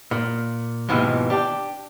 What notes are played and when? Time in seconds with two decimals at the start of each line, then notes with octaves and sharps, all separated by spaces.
0.11 A#2
0.89 D#2 G#2 B2 E3 F3
1.30 D4 G4